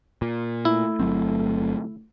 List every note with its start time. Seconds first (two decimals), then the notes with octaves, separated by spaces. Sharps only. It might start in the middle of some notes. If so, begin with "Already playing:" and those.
0.22 A#2
0.65 A3 E4
1.00 G1 F#3 C4